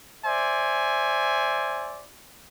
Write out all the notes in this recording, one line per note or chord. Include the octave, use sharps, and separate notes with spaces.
C5 D5 E5 G#5